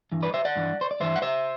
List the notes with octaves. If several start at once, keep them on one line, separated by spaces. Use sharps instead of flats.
G2 E3
B4 D5
C5 E5
D5 F#5
G2 E3
C5
D5
G2 E3 C5 E5
F#5
C5 E5